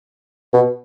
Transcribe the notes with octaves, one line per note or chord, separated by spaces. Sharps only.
B2